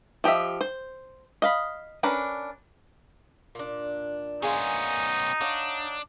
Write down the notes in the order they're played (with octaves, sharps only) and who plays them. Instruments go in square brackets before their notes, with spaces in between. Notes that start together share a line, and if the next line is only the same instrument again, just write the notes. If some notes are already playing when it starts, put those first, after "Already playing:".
[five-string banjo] F3 G4 D#5 E5
C5
D#5 F5 B5
C#4 D4 A#4 B4
[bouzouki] A#2 D4
[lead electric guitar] B3 C#4 [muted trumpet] D#4 [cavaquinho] G#4 F5 C6
[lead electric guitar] D4 [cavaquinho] C#5 F5 F#5